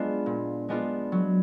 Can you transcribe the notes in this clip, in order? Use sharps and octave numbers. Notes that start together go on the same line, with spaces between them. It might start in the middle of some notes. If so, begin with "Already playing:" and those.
Already playing: G#3 B3 D4 F4
A#2
G#3 B3 D4 F4
F#3